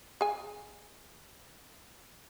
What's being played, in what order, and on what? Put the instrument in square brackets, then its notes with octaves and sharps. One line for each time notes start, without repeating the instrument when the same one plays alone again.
[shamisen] G#4 G#5